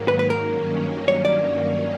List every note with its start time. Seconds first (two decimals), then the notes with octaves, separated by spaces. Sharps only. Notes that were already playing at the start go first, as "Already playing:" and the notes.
Already playing: G#2 D#3 F#3 A#3
0.08 B4
0.19 B4
0.30 A#4
0.41 G2 D#3 F#3 A#3 C#4
1.08 C#5
1.25 D5